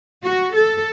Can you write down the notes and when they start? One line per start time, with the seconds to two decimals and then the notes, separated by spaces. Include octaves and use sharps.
0.24 F#4
0.55 A4